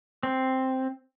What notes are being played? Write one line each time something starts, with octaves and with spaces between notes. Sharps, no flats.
C4